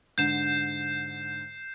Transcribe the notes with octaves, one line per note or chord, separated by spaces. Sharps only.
G#2 D3 G6 C7 E7